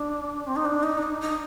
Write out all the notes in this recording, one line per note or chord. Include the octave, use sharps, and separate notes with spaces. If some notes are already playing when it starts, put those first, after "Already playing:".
Already playing: D4
C4
D#4
D4
D#4
D4
D#4
D#4